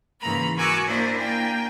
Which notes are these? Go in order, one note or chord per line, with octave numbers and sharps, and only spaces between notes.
G#2 C#3 E3 A#3 A#5 B5
F#4 A#4 G#5 D6 E6 F#6
A#3 D4 E4 C5 D#5
A#3 D4 G5 G#5